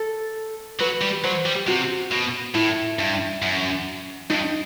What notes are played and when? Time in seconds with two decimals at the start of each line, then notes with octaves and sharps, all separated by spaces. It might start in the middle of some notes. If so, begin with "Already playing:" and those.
Already playing: A4
0.80 F#3 B4
1.01 G3
1.24 F#3 C5
1.46 G3
1.67 C3 F#4
2.12 B2
2.55 A2 E4
2.99 G2
3.42 F#2
4.30 G2 D#4